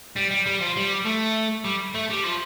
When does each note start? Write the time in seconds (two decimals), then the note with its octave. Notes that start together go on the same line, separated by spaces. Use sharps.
0.16 G3
0.31 G3
0.46 G3
0.61 F3
0.76 G3
1.05 A3
1.65 G3
1.94 A3
2.10 G3
2.24 F3